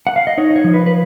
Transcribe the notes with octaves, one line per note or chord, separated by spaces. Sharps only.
F#5
F5
D#5
D#4 C#5
D#5
C#5
F3
B4
B4